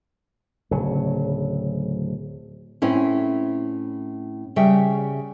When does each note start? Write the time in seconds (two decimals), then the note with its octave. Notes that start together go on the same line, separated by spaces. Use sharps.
0.71 D1 C#3 F#3
2.82 A2 C4 C#4 E4
4.56 C#3 G3 E5 G5